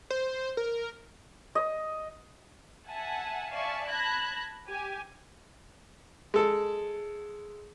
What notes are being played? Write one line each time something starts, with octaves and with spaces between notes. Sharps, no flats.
C5
A#4
D#5
E5 F#5 G#5 A5
D5 E5 F5 G#5 A5 C#6
A5 B5 F#6 G#6 A#6
G4 G#5
G#3 A4